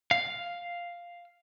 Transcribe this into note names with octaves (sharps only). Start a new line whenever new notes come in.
F5